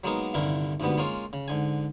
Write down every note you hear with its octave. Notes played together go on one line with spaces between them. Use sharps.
F#3 G#3 A#3 B3 D#4 A#4
C2 G2 D3 D#3 E4 A#4
D2 G#2 B2 G3 B3
G#3 A#3 C#4 F4
C#3
G#2 D3 G#5